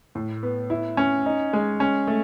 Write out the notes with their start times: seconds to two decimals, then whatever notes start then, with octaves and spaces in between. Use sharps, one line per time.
0.15 A2
0.43 B3
0.70 E4
0.97 C#4
1.26 D#4
1.53 G#3
1.80 C#4
2.07 A3